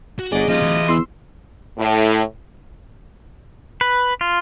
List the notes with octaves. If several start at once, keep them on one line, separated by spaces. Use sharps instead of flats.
F#4
G1 F#3 G#4 D5 D#5
D#1 C3 F3 F4 D#5
D1 E3
E2 C6 E6
A2
B4
F4